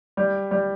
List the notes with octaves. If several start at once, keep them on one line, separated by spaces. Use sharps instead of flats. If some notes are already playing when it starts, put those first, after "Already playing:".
G3
G3